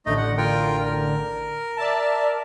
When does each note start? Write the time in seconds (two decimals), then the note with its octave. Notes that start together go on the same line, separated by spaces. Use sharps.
0.06 A1 D3 A3 D#4 D#5
0.17 F#5
0.38 F4 A#4 G5
0.86 A#4
1.76 D5 E5 A5